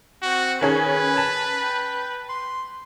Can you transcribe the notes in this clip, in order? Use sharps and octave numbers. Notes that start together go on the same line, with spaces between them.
C4 F#4
D#3 C#4 G#4 B4 G#5
A5
G5
C6